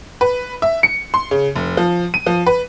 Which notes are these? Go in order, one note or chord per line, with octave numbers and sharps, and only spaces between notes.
B4
E5
C#7
C6
C#3
F1
F3
D#7
F3
B4